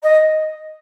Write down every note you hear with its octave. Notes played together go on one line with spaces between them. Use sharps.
D#5